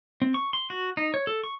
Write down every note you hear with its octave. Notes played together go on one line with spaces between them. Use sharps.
C4
C#6
C6
F#4
D#4
C#5
A4
C#6